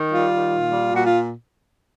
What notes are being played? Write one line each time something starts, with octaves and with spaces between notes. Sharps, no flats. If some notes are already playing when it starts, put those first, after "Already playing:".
Already playing: D#3
G3 F4
D#3
A#2
G3
A#2 F#4
F4